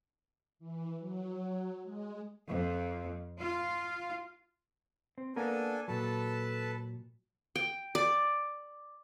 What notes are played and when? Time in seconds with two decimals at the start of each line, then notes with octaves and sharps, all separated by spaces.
0.59 E3
0.99 F#3
1.83 G#3
2.47 F2
3.40 F4
5.18 C4
5.36 A#3 B3 D4 A4 A#4 G#5
5.88 A#2 F#3 A4 B4 A5
7.55 G5
7.95 D5